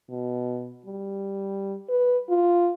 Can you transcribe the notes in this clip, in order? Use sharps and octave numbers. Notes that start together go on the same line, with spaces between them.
B2
G3
B4
F4